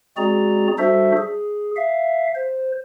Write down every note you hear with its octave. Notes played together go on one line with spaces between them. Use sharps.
G#3 C4 F#4 G#4 D5 A#5
G3 D4 F#4 A4 C5 E5
G#4
E5 F5
C5